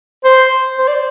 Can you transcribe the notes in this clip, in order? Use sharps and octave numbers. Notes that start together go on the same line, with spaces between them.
C5
C5
D5